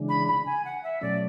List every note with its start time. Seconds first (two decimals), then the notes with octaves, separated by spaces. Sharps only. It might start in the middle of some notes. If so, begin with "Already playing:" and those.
Already playing: C#3 E3 G#3 D4
0.09 B5
0.27 B5
0.45 G#5
0.64 F#5
0.83 E5
1.01 B2 F#3 A3 C#4 D5